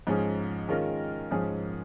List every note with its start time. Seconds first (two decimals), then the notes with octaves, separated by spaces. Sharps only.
0.07 G#2 F3 C#4 G#4
0.68 D#3 G#3 C#4 F4 A#4
1.31 G#2 F3 C#4 G#4